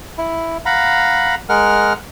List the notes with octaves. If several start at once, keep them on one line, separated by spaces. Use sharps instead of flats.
E4
F5 F#5 A#5 B5
G#3 A#4 F#5 F6